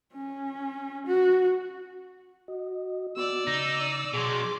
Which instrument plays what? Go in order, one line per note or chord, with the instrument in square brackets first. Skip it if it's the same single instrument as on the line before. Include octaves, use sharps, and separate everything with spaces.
[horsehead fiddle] C#4
F#4
[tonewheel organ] F#4 D#5
[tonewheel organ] B3 F#4 [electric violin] D5 E6
[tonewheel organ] C#3 [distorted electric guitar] D#4
[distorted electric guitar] B2 F#3 [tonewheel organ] G#4 [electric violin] C6 D6